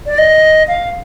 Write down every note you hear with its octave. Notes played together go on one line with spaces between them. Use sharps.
D5
D#5
F5